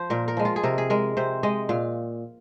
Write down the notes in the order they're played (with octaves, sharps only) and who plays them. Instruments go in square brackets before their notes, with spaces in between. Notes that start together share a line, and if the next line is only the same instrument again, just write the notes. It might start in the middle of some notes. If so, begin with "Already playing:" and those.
Already playing: [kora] F3 C5
A#2 A#4
A#4
F3 G#3
F4
G#4
C3 A#4
G#4
G#3 A#4
C3 C5
G#3 D#5
A#2 F5